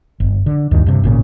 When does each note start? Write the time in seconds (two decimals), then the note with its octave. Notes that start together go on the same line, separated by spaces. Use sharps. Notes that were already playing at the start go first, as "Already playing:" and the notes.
0.20 G1
0.46 D3
0.71 D2 G2 D#3
0.86 G2 C3
1.04 G#1 A#2 C#3